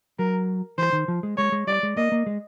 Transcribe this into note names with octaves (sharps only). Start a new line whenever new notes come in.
F#3 A#4
E3 C5
D#3
F3
G#3
G#3 C#5
G#3
G3 D5
G#3
A#3 D#5
A#3
G#3